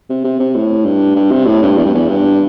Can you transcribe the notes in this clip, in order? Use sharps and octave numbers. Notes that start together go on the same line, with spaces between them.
C3
C3
C3
A2
G2
G2
C3
A2
G2
E2
G2
E2
G2